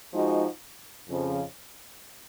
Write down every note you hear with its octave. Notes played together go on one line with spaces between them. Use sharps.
F3 G#3 D#4 F#4
F2 C#3 F3